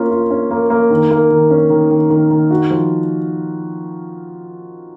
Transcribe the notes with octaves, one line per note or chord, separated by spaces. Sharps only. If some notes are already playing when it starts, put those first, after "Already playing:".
Already playing: A#3 C#4 F4
F4
C#4
A#3
A#3
D#3
A#3
D#3
C#4
D#3
D#3
D#3
D#3
F#4
F3